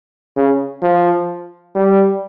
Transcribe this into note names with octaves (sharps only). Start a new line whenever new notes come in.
C#3
F3
G3